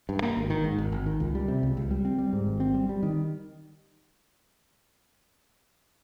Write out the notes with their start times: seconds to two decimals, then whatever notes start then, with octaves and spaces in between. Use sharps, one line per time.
0.09 G2
0.22 A#3
0.37 G#1
0.50 D#3
0.64 G#2
0.78 G#1
0.92 G#1
1.06 D#3
1.20 C#2
1.35 G3
1.48 C3
1.63 C#2
1.77 C#2
1.91 G3
2.05 C4
2.18 G3
2.33 G#2
2.47 G#1
2.60 C4
2.74 G3
2.89 G3
3.03 D#3